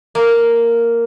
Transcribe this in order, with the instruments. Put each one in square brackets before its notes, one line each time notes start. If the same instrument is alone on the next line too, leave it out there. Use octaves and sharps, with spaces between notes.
[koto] A#3